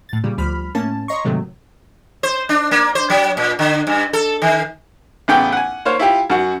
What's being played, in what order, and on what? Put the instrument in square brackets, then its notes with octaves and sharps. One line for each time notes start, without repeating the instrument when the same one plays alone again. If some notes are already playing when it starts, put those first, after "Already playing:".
[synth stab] A2 A6
A#2 C#3 G3
D2 F3 G3 B5 F6
A2 A#3 C#4 A5
C#5 D#5 A#5 C6 C#6
G#2 C3 D#3 F#3 G#3 A3
[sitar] C5
D4
A#3
C5
F#3
A#2
D3
G2
A4
D#3
[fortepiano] A1 C#3 B3 G5
F#5 G#5
A#3 C5 C#5 F5
E4 F4 G4
F#2 F#4